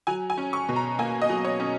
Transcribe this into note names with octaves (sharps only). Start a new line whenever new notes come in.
F#3 G#5
G#5
C#4
C#6
B2
A#5
A#3 G#5
D#5
F#3
C#5
C#4